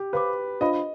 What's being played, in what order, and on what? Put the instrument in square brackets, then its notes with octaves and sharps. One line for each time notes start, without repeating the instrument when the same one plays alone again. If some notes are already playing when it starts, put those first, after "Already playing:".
Already playing: [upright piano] G4
[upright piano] B4 [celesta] C5 F5 B5 D6
[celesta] D4 F4 C5 F5 B5 [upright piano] D#5